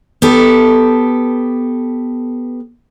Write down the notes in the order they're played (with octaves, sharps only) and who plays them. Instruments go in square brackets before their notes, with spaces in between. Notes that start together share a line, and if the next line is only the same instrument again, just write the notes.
[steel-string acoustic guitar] B3 G4 A4